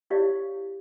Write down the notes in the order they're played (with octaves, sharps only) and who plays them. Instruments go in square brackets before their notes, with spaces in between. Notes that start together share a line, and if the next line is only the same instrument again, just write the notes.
[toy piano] E4 G4 C#5 D5 F5